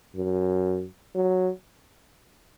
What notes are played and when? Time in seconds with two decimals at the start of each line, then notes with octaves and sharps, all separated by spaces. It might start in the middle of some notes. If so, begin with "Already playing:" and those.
0.16 F#2
1.15 F#3